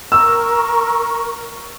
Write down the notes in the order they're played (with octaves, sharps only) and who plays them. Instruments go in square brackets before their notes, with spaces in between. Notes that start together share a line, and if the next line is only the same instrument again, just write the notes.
[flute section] A#4 C#6 [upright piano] E6